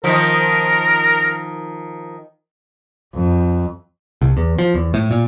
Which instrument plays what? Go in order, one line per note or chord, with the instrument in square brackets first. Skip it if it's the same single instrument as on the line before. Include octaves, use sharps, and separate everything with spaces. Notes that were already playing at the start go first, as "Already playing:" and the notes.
[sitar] D#3 F3 [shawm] A#4
[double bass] F2
[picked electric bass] C2
E2
F3
E2
A2
A#2